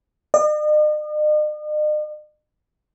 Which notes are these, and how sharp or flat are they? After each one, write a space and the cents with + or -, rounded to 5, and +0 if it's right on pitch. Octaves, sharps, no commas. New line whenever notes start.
D#5 -45